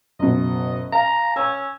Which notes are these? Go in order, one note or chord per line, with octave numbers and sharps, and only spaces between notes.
F#1 B2 D#5
F5 A#5
C#4 E6